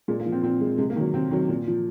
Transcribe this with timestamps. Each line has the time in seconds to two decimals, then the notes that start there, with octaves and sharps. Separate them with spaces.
0.08 A#2 G#3
0.20 A#3
0.26 F3
0.32 C4
0.43 A#2 C4
0.61 F3 G#3
0.78 C3 G#3
0.90 A#3
0.96 D#3 F#3
1.14 C3 C4
1.31 D#3 F#3
1.49 A#2
1.67 F3